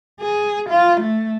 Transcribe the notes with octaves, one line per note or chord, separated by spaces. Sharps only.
G#4
F4
A3